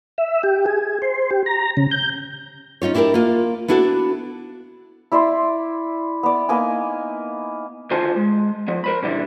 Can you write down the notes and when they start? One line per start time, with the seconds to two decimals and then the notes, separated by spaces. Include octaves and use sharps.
0.18 E5
0.43 G4
0.66 G#4
1.02 C5
1.31 G4
1.46 A#5
1.77 C#3
1.91 G6
2.82 C#4 D#4 F4 C#5
2.95 D4 E4 G4 A4 A#4
3.14 A#3 F4
3.68 B3 D4 E4 F#4 A4
5.12 E4 D5 E5 C6
6.23 B3 D5
6.49 A#3 B3 D#4 G#5
7.91 D2 D#3 F4 C5 G#5 A5
8.16 G#3
8.68 F3 B3
8.84 A#4 C5 B5
9.02 A#2 D3 E3 G3 D4 E4